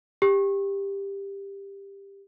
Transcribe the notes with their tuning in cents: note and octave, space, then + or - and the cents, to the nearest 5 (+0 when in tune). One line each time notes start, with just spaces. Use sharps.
G4 +15